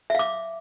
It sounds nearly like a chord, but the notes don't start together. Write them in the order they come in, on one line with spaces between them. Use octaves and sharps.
E5 F5 D6